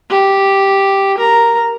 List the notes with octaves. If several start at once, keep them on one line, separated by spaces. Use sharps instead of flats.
G4
A#4 A#5